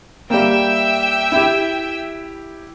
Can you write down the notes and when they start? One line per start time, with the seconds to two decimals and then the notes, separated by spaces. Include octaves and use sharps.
0.30 G3 A#3 E5 G5 E6
1.32 E4 G4